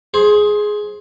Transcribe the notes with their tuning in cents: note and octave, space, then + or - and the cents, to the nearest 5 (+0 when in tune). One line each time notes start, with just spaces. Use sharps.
G#4 +10 C5 +15